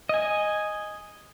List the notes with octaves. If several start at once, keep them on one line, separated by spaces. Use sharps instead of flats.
D#5 G#5